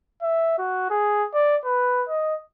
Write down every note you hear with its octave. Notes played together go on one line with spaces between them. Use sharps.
E5
F#4
G#4
D5
B4
D#5